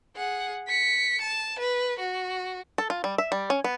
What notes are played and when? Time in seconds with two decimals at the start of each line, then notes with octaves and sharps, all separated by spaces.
0.16 G#4 F#5
0.68 B6 C#7
1.22 A5
1.59 B4
1.99 F#4
2.78 A4
2.90 F4
3.04 G3
3.18 E5
3.32 G3
3.50 C#4
3.64 B3